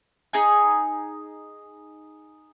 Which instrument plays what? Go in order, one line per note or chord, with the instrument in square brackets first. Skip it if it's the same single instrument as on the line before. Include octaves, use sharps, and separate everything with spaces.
[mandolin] D#4 G#4 G#5